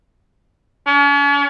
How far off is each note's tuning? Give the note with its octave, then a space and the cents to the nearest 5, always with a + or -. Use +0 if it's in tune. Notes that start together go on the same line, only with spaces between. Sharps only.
C#4 +45